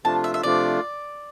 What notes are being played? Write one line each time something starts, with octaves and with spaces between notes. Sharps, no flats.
C3 F3 A3 D4 F4 A5
E5
E5
C3 F3 A3 D4 F4 D5